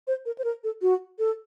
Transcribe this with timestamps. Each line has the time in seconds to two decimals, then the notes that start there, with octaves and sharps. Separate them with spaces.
0.07 C5
0.26 A#4
0.38 C5
0.44 A#4
0.64 A4
0.82 F#4
1.19 A4